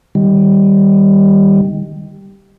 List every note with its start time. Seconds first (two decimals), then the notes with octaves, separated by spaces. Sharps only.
0.15 D#3 G3